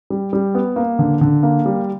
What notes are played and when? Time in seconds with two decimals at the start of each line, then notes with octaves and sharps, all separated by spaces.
0.10 G3
0.33 G3
0.55 B3
0.76 A#3
0.99 D3
1.21 D3
1.43 A#3
1.66 G3